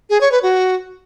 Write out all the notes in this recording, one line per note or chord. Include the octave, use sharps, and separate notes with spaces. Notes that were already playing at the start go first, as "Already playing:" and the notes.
G#4
C#5
B4
F#4